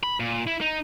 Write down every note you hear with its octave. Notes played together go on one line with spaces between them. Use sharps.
B5
A#2
E4
D#4